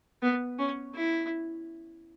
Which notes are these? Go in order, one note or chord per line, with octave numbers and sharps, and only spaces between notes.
B3
C#4
E4